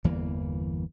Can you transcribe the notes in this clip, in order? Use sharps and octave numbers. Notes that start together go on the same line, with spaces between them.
G1 E2 E3 A#3